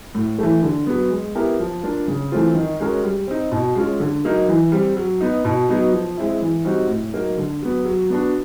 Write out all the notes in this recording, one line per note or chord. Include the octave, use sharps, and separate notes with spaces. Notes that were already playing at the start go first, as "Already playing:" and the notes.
A2
E3 A3
D3
F#3 B3
G#3
B3 E4 G4 A#4
F3
A#3 D4 F4
C#3
E3 A3 C4 F4
D#3
G#3 C#4 F#4 A#4
G3
C4 D#4
B2
G#3 C#4 F4
D3
F#3 A#3 D#4
E3
G3 C4
F#3
B3 D#4
B2
F#3 B3 D#4
F3
G#3 C4 E4
E3
G3 C4 D#4 F#4
A2
F#3 A#3 D#4
D3
F#3 B3
F#3
B3 D4 F#4